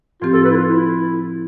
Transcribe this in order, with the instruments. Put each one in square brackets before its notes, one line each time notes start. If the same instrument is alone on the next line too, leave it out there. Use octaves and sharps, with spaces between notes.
[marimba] A2 F3 C4 G4 [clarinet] F4
[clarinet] A4
B4
E4
F4
E4